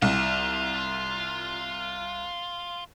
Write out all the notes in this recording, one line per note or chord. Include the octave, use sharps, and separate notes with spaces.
C2 F4